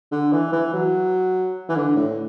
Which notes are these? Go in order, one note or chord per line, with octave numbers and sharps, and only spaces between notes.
D3
E3
E3
F#3
E3
D3
A2